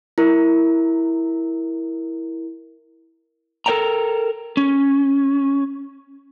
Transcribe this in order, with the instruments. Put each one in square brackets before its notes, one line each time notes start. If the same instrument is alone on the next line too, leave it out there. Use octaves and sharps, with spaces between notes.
[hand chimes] E4 A#4
[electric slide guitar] A4 A#4 C5 D#5 G5 A#5
C#4